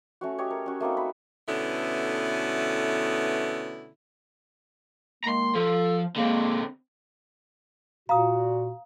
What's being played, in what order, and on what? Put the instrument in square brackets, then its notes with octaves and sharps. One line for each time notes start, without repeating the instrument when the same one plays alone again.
[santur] A3 C#4 F#4
G4 C#5 D#5
A#4
C#4 F#4
A3 A#3 C4 D#4
B5
[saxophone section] B2 D3 A3 B3 C#4 E4
[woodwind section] D#3 G#3 A#3 [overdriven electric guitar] A#5 C6
[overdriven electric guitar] F3 [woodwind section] A4
[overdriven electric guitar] D3 C4 [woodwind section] G#3 A#3
[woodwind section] A#2 F#4 [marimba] F5 [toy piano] A#5 D#6